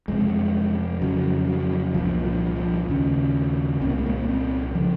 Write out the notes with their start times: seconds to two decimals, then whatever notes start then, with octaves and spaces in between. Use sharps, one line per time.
0.08 F2 C3 G#3
1.01 F2 C#3 F#3
1.48 F#3
1.94 C2 A#2 F3
2.26 F3
2.56 F3
2.88 D#2 C#3
3.81 C2 C4
3.85 A#2 A#3
3.98 G#3
4.06 A#3
4.28 C4
4.75 C#3 F3